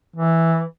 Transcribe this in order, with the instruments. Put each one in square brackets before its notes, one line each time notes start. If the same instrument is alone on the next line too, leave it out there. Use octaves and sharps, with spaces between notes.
[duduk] E3